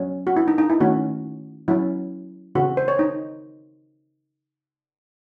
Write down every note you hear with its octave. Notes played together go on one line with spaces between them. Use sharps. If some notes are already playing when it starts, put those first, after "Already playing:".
Already playing: F#3 C#4
F#4
E4
D#4
D#4
E4
D#3 A3 C#4 F#4
F#3 C#4 E4
C#3 E3 C4 F#4
C5
C#5
D#4